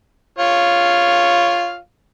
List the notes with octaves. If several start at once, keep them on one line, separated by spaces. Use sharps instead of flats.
F4 C#5 F5